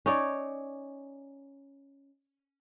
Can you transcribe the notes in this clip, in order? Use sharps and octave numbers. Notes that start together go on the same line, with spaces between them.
C#4 D#4 C#5 D5